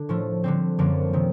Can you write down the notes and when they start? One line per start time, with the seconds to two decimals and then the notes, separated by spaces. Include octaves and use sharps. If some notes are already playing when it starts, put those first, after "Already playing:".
Already playing: D3 D4
0.09 A2 F3 A3
0.44 D3 G3 C4
0.78 F#2 D3 F3 A#3
1.13 C3 D#3